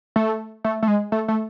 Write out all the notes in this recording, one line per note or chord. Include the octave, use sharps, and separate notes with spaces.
A3
A3
A3
G#3
A3
A3